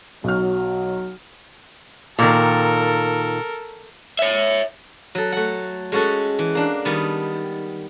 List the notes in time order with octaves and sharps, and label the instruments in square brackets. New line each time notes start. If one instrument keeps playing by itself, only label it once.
[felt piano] B1 F#4 F6 [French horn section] F#3
[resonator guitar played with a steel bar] A#2 D#3 [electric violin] A4 A#4
[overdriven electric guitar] C#5 E5
[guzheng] F#3 A4
A3 F#5
G#3 C#4 F#4 A4
E3
A#3 D4
D#3 G3 B3